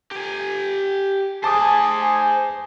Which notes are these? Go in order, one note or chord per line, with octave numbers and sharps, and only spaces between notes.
G4 G#5
G#4 C5 G#5 A5 D6 D#6